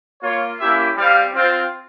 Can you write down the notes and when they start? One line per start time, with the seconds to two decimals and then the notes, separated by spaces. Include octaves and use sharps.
0.23 A#3 F4 C#5
0.60 A#3 C#4 E4 G4 E5
0.97 G3 C4 G4 F5
1.34 C4 F4